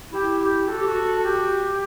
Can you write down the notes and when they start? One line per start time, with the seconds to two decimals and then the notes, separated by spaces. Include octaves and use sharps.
0.12 E4 G4
0.41 G4
0.67 F#4 A4
0.78 G4
0.87 F#4
1.23 G4